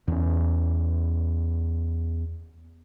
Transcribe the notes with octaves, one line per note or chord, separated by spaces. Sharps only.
E2 C#4